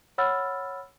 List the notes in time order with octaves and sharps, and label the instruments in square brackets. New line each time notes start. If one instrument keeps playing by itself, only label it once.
[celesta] C#5 F#5 B5 E6 F6 A6